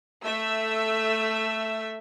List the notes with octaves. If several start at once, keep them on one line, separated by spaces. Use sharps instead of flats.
A3 E5 E6